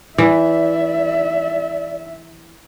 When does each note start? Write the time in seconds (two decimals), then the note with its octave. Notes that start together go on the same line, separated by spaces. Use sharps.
0.18 E3 D5 E5